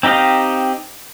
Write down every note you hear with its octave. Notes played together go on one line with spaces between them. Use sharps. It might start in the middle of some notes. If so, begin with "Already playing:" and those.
C4 D#4 G4 D#5 F5